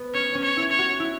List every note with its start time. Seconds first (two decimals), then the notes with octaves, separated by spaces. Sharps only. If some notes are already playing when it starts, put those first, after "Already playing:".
Already playing: B3
0.14 C#4 C#5
0.35 C#4
0.43 C#5
0.57 E4
0.71 C#5
0.79 F#4
1.00 E4